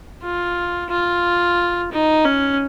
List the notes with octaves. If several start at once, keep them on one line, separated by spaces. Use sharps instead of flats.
F4
F4
D#4
C#4